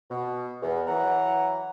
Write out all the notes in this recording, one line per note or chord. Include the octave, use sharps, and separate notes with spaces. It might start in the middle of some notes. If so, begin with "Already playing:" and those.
B2
E2
E3 F#3 F#5 A#5